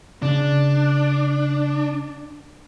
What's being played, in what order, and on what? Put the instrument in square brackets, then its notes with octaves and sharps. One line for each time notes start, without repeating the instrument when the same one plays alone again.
[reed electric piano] C#3 [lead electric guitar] D4